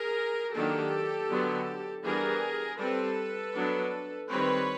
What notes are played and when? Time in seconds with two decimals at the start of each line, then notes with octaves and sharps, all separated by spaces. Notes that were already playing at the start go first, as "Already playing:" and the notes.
Already playing: G#4 A#4
0.53 D#3 F#3 A#3 D4 G4 A4
1.29 D3 F#3 B3
2.04 E3 G3 B3 D4 G#4 A#4
2.79 G3 C4 A4 B4
3.54 F#3 B3 D4
4.29 D#3 G3 C4 B4 C#5